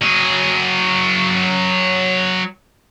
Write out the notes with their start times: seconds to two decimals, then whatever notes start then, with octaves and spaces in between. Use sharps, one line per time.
0.02 F#3 G#4